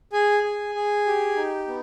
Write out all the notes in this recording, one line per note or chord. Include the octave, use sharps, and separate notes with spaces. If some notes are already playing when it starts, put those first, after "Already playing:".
G#4 G#5
G#4
G#4
G4
D#4
B3